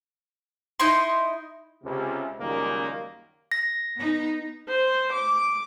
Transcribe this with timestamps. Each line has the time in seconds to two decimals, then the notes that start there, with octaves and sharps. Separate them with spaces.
0.80 D#4 E4 D#5 C6
1.83 C#2 C3
2.39 C#2 F#2 D#3 G3 A#3
3.52 A#6
3.96 B3 D#4
4.69 C5
5.12 D6